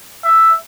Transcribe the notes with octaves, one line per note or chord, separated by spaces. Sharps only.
E5